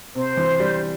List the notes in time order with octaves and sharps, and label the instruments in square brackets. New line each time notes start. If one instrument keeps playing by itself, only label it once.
[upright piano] C3 [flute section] C5
[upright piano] E3
G3